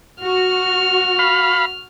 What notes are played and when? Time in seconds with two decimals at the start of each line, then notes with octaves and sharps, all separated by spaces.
0.21 F#4 F6
1.19 F5 B5